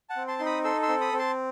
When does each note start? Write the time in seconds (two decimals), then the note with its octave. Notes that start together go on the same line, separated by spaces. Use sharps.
0.09 F#5 A5
0.16 C4
0.28 A5 C6
0.39 D#4 C6
0.46 B5 D#6
0.64 A4 C6 E6
0.82 C6 E6
0.89 C4
1.01 B5 D#6
1.13 C4
1.19 A5 C6